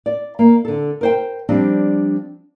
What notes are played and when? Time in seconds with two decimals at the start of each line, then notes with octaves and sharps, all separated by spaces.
0.06 D5
0.39 A#3
0.65 D3 A4
1.01 A#4 C5 G5
1.49 F3 G3 C4 D4